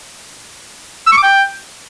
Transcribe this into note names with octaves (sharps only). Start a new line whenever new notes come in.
E6
C#6
D6
G5